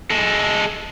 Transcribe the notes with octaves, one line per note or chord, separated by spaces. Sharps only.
G#3 A4